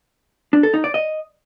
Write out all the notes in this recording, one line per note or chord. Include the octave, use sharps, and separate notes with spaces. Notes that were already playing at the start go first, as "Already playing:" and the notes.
D4
A4
D#4
D5
D#5